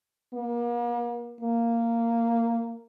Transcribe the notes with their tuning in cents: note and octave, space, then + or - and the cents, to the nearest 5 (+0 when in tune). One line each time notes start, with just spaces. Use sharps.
A#3 +40
A#3 -10